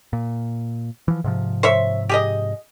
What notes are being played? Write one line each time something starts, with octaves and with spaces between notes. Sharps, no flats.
A#2
E3 F3
G#2 C3 F3
C5 C#5 E5
G4 G#4 D#5